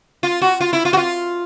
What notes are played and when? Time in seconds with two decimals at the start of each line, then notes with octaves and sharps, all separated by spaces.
0.23 F4
0.42 F#4
0.61 F4
0.73 E4
0.85 F4
0.93 F#4
0.97 F4